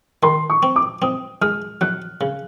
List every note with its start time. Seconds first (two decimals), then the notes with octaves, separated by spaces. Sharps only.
0.23 D#3 C6
0.50 C#6
0.63 C4
0.76 D6
1.02 C4 D#6
1.41 G#3 F6
1.81 F#3 F#6
2.21 C#3